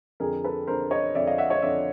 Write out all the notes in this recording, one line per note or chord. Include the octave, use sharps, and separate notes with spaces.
F2 D3 G#4 A#4
A4 B4
F2 D3 A#4 C5
C#5 D#5
F2 D3 D5 E5
D#5 F5
E5 F#5
C#5 D#5
F2 D3 D5 E5